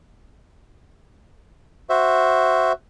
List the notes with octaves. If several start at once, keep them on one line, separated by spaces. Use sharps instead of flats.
F#4 C5 E5